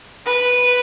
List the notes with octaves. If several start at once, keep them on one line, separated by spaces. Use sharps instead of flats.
B4